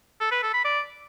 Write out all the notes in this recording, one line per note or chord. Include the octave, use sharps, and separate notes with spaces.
A4
B4
A4
B5
D5